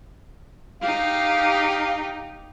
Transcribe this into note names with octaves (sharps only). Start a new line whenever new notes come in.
D#4 G4 F5